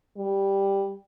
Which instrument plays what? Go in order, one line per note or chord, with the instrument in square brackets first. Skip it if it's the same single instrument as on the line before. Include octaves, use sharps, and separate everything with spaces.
[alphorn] G3